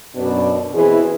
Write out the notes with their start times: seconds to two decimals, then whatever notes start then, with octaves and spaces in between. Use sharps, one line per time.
0.15 F#2 B2 D4
0.74 B2 E3 C4 E4 G#4